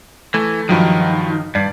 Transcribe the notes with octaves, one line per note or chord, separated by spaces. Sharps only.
E3 A3
G2 D#3 F3 F#3
G2 D5